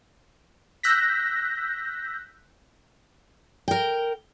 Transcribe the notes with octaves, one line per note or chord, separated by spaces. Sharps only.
E6 F#6 G6 A#6 B6
A#4 G5